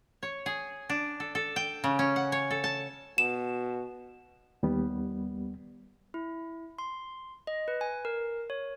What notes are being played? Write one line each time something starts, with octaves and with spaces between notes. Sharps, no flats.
C#5
G#4
D4
A4
A4
G5
C#3
C#4
F#5
C#5
A4
A5
B2 E7
D#2 G3 B3
E4
C6
D#5
B4
G#5
A#4
C#5